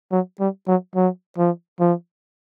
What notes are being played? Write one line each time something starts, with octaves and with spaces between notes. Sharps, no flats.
F#3
G3
F#3
F#3
F3
F3